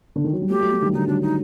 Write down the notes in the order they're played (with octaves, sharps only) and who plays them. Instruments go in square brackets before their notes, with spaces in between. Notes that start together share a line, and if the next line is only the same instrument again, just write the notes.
[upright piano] D3
D#3
F#3
G3
[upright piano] F#3 A3 [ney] G4
[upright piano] F#3 A3
F#3 A3
D#3 G3
[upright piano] D3 F#3 [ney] D#4
[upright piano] D3 F#3 [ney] D4
[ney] D#4